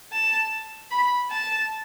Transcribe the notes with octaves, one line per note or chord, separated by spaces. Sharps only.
A5
B5
A5